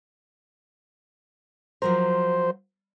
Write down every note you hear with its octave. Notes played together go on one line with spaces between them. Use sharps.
F3 F#3 A#4 C5